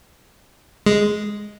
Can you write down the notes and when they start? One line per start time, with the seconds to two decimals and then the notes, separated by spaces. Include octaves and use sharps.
0.86 G#3